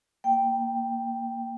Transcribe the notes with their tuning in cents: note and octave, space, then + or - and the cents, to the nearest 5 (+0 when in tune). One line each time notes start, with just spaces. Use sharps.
A#3 +0 G5 +0